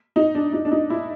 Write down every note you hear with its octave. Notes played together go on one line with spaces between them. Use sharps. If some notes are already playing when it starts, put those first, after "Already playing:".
D#4
D4
D#4
D4
D#4
E4